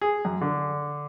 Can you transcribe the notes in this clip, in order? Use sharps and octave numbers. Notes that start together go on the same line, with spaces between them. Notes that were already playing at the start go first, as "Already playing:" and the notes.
G#4
F#2
D3